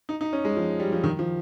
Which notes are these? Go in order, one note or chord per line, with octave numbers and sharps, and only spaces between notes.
D#4
D#4
C#4
G#3
F3
G3
F3
D#3
F3